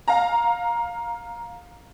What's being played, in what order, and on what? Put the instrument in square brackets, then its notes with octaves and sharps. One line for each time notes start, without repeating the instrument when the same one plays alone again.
[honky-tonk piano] F5 A#5